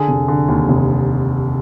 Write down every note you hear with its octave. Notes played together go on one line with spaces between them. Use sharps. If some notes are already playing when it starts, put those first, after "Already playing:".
Already playing: D3 G#4
F1
D3
D#2
F1